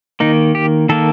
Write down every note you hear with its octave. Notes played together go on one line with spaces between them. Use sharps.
D#3 A#3 D#4
G4
D#3 A#3 A4